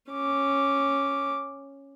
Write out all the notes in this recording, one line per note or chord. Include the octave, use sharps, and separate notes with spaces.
C#4 D6